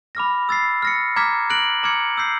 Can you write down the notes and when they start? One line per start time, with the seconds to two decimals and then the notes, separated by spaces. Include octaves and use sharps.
0.15 B5 D6 F6 A#6
0.49 E6 A6 C7
0.82 F6 A#6 C#7
1.16 A#5 D6 F6 G#6 B6
1.50 F#6 A#6 D7 F#7
1.83 A#5 D6 F6 G#6 C#7
2.17 E6 G6 C7